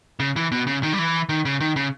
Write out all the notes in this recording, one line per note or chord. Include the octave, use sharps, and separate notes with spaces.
C#3
E3
B2
C#3
D#3
G3
E3
D#3
C#3
D#3
C#3